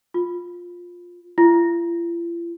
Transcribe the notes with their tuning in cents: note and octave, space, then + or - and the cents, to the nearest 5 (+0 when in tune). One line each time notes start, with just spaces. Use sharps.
F4 +10
F4 -45